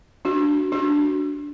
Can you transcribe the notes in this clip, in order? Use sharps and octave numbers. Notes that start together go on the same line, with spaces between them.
D4 F#4
D4 F#4